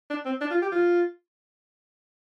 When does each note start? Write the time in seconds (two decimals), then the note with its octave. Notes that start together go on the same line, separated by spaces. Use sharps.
0.10 D4
0.25 C4
0.41 D4
0.51 F4
0.62 G4
0.72 F4